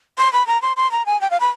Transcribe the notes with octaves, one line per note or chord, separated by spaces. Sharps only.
C6
B5
A#5
C6
C6
A#5
G#5
G5
F5
B5